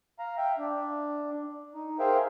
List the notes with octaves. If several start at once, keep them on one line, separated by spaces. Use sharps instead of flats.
F5 A#5
E5 G5
D4
D#4
G#4 A#4 C5 E5 F5 G5